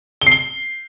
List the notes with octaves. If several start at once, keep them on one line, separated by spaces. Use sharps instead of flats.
G7
C7
G7